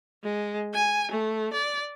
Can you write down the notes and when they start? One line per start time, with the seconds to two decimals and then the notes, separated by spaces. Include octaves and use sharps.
0.24 G#3
0.74 G#5
1.11 A3
1.53 D5